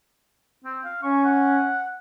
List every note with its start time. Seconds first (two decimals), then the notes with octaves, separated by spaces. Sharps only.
0.64 C4
0.84 F5
1.02 C#4 C#6
1.24 F#5